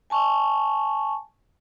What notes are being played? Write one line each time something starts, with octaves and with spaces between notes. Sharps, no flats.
G#5 A5 C#6